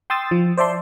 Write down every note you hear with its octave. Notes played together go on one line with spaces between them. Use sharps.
G5 C6 D#6 E6 A6
F3
C5 D5 E5 A5 C6